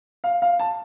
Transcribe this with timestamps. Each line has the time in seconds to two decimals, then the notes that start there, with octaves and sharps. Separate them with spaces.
0.24 F5
0.42 F5
0.59 A5